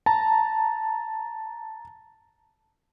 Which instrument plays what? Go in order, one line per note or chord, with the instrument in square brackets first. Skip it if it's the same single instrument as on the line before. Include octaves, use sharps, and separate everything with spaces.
[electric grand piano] A5 A#5